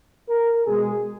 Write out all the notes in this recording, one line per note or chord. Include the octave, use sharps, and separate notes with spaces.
A#4
B2 G#3 G#4